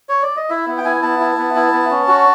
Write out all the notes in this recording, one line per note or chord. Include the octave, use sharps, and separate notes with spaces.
C#5
D5
D#5
E4 E5
B3
G5
E4 G#5
B3 A5
E4
B3
E4
B3
C#4
F#4